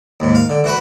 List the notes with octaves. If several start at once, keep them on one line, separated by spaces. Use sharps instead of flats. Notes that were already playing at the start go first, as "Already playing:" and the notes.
D#2 G#2
F5
D3
E3 F#4 B4